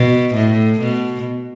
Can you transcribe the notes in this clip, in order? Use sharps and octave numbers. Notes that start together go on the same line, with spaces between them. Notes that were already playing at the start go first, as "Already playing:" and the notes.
Already playing: B2
A2
B2